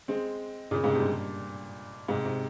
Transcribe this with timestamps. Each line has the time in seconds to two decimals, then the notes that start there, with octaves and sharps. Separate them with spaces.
0.08 G#3 C4
0.71 A#2 C#3
0.84 G#2 C3
0.96 G2 A#2
2.08 G#2 C3
2.25 C3